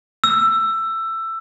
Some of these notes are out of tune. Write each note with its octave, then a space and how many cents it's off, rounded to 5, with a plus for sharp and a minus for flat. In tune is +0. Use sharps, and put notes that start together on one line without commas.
E6 +15